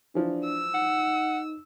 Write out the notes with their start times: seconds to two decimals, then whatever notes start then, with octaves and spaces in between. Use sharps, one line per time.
0.15 E3 F3 D4
0.45 E6
0.74 D#4 F#5